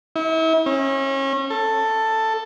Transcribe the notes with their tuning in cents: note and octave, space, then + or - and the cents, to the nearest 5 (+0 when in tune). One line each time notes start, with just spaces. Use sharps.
E4 -35
C#4 -30
A4 +10